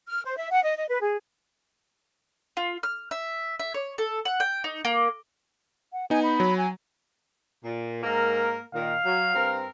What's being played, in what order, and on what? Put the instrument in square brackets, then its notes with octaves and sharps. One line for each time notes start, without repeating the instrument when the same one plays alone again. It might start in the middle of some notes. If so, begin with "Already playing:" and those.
[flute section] F6
C5
E5
F#5
D#5
D#5
B4
G#4
[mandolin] F4
F6
E5
E5
C#5
A4
F#5
G5
D#4
A#3
[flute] F#5
[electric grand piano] B3 D#4 [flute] G#5
[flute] B5
[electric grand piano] F#3
[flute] G#5
[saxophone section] A#2
G#2 A#3 A#4
[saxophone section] A#2 D#3 [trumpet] F5
[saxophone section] F#3
G2 C4 A#4